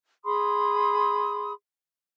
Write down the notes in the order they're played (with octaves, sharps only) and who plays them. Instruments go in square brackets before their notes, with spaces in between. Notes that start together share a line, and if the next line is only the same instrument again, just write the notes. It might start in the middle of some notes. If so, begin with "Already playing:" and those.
[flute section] G#4 B5 C6 D#6